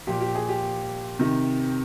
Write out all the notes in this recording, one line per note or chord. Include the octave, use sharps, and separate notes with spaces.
A#2 F3 G4
G4
G#4
G4
C3 D#3